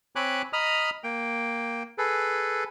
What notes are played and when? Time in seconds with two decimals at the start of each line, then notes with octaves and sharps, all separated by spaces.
0.16 C4 C#5 G#5 B5 D6 F#6
0.53 D#5 A#5 B5 D#6 F6
1.04 A#3 G5
1.98 G#4 A4 B4